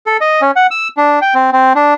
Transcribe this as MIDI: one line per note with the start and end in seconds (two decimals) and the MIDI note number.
0.07 0.17 69
0.21 0.41 75
0.42 0.51 61
0.56 0.67 78
0.71 0.88 88
0.97 1.19 62
1.22 1.34 79
1.34 1.50 60
1.53 1.73 60
1.75 1.94 62